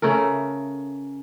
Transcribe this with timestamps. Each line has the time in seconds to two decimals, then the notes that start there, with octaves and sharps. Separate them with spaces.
0.02 C#3 A3 A4 A#4